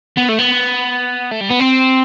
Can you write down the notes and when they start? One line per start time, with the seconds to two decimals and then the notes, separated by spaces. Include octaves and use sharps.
0.17 B3
0.29 A3
0.39 B3
1.31 A3
1.41 G3
1.50 B3
1.59 C4